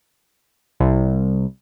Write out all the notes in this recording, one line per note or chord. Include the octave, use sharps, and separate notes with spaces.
C2